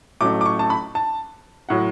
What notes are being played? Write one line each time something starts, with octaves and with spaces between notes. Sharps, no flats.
A1 A2 F#3 A3 D6
D6
C#6
A5
B5
A5
A2 F#3 F#5